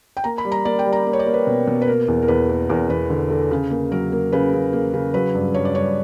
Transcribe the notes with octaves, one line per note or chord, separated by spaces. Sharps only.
G5
A#3 A#5
B5
G3
A#5
A#3 D5
G5
G3
A#5
A#3
C#5
D5
A#3
B4
B2
B2
B4
A#3 A#4
E2
A#4
E2 B4
A#3
E2 A#4
E2 B4
D3
D3
C#3
A#3
F#3 A#4
A#3
C#3 B4
C#3
A#3
C#3
F#3 B4
G2
G2 C#5
D5
G2 C#5